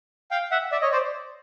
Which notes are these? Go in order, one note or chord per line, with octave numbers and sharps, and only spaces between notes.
F5 G5
E5 F#5
D5 E5
C#5 D#5
C5 D5